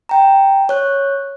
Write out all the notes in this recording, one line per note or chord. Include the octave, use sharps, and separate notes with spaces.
G5 A#5
C#5 F#6